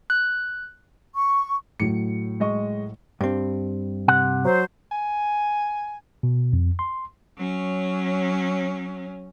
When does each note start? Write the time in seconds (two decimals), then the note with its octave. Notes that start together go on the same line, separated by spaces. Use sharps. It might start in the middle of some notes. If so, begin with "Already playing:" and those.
0.10 F#6
1.14 C#6
1.80 A2 F#3 C#7
2.40 G#3 D#5 C#6
3.21 G2 C4
4.08 C3 F#5
4.44 F#3 C5
4.91 G#5
6.23 B2
6.53 F2
6.79 C6
7.37 F#3 C#4